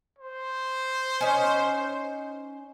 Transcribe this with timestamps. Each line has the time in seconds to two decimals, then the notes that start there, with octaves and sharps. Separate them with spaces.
0.19 C5
1.21 C#4 D#4 C#5